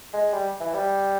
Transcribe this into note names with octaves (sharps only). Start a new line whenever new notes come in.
G#3
G3
E3
G3